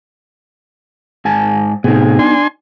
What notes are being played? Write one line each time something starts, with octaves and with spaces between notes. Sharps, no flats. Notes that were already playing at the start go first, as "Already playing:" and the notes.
G#2 G#5 A5
A2 C3 B3 D#4 G#4
D4 G#5 C6